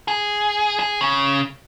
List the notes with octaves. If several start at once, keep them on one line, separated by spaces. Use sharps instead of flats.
G#4
G#4
C#3